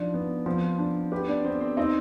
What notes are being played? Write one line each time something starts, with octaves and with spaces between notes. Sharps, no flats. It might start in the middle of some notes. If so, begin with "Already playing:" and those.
Already playing: F3 D4 D#4 D5
B3
F3 C4 C5
D4
B3 G4 B4
D4 D5
B3 C4 C5
C4 C5
C4 D#4 D#5